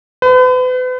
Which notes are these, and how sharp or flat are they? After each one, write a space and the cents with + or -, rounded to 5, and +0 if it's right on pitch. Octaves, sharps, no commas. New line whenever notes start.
B4 +40